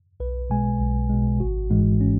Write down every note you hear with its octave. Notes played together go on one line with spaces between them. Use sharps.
B1 B4
B2 G#3 G#5
B1
B2 G#3
G#1 F#4
G#2 E3 G#3
C#4